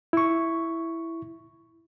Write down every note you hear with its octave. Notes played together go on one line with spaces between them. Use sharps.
E4 C#6